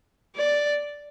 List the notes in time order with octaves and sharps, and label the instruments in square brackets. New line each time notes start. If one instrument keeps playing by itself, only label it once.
[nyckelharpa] D5